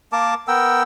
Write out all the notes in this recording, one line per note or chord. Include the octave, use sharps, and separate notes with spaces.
A#3 A#4 A5 D6
B3 A#4 G5 E6